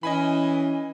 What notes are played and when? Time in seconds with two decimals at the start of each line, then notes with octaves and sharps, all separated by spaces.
0.03 E3 C#4 D#5 G#5 B5